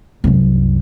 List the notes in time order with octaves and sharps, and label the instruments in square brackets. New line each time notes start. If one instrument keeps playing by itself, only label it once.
[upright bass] C2 F#2